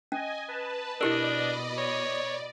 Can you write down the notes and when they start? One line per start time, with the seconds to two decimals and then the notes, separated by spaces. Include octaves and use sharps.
0.12 C#4 D#5 G#5
0.48 B4 A5
1.01 B2 D4 E4 G4 A#4 D5 D#5 B5
1.78 C#5